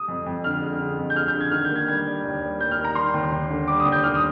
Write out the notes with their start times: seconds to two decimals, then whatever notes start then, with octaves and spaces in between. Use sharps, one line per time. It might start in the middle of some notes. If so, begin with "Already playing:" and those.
Already playing: D#6
0.08 F2
0.26 F2
0.44 D3 F6
0.62 G#3
0.80 D3
0.98 F2
1.10 G6
1.16 G#3 F6
1.28 G6
1.35 D3
1.40 G#6
1.52 D#3 F6
1.65 G6
1.71 A#3 G#6
1.88 G3 G#6
2.07 G3
2.24 D#2
2.42 G3
2.60 A#3 G6
2.71 F6
2.78 D#3
2.85 A#5
2.95 G3 C6
3.14 D#2
3.32 D#2
3.50 D3
3.68 G3 D6
3.80 D#6
3.86 D#2
3.92 G6
4.03 D#2 F6
4.15 D#6